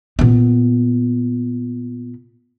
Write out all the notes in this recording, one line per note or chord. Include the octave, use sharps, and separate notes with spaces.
A#2 B3